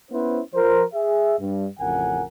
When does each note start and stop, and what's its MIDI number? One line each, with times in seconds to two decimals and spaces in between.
0.12 0.40 59
0.12 0.40 61
0.12 0.40 64
0.12 0.40 71
0.12 0.40 72
0.55 0.83 53
0.55 0.83 70
0.55 0.83 72
0.94 1.36 68
0.94 1.36 76
1.40 1.66 43
1.80 2.23 33
1.80 2.23 41
1.80 2.23 49
1.80 2.23 70
1.80 2.23 78
1.80 2.23 80